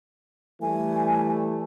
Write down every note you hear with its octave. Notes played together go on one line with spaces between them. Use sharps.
E3 G3 A3 G#5